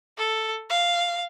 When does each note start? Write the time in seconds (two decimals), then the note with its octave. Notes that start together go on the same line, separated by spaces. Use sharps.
0.17 A4
0.70 F5